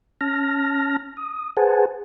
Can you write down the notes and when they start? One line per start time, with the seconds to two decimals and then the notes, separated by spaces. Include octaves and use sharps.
0.21 C#4 A5 F6 A#6
1.17 D#6
1.57 G#4 B4 C5 F#5 G#5 A5